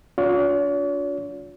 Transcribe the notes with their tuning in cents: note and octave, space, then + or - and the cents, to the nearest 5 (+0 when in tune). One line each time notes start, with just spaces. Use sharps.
D4 -35 F4 +40 C#5 +45